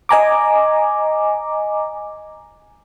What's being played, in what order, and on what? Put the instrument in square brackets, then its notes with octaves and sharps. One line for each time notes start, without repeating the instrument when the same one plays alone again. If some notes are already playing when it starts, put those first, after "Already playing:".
[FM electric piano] D#5 G#5 A#5 D6